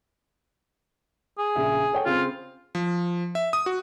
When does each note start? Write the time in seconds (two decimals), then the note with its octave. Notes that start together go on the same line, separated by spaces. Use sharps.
1.39 G#4
1.56 A#1 C#3 E5
1.93 A4 C#5 G5
2.06 C#3 C4 F4
2.75 F3
3.35 E5
3.53 D#6
3.66 F#4